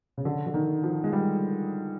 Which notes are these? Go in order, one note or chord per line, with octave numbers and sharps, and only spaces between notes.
C#3
D3
D3
D#3
F3
G#3
G3